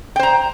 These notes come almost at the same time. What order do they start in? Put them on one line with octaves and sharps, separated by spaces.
G5 C5 A#5